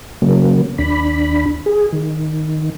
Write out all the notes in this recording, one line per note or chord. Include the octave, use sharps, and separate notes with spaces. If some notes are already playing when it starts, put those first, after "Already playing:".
C#3 F#3 A#3
D#2 D4 B5
G#4
D#3